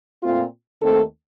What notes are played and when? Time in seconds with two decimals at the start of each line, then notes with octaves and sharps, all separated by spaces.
0.23 A#2 A3 C4 F4
0.81 D#2 D#3 A3 C4 A4